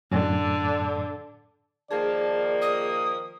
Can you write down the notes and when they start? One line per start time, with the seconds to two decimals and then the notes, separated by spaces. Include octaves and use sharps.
0.11 F#2 A2 D3
1.91 D#3 F3 A#3 G#4 D5 A5
2.61 D#6